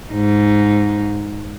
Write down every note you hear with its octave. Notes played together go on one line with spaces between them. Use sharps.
G#2 D#4